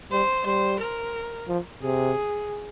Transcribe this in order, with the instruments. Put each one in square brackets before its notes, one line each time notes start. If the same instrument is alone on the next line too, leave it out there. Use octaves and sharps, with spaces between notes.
[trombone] G3 [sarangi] C5
[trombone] G3 [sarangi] C5
[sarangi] A#4
[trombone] F3
[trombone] C3 [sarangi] G#4